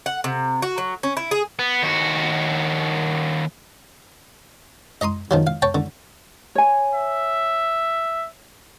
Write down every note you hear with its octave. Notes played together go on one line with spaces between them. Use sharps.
F#5
C3
F#4
F#3
C#4
E4
G#4
B3
D#2 F#4
D#5 A#5 C6 D#6
D#3 F3 F#3
F5
C#5 G5 A5
D3
C#5 G#5
E5